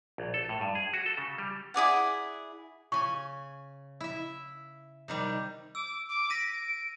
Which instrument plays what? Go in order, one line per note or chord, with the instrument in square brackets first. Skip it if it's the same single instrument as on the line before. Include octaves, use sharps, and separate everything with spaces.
[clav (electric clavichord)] A#1
A4
A2
G2
G#4
F#4
A4
C#3
G3
[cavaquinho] E4 G#4 D5 F#5
[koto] C#3 G#5 [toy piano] C#6
[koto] E4 E5
C3 D#3 G3
[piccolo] D6 [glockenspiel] E6
[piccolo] D6
[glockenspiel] A#6 D#7 [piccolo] B6
[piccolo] D7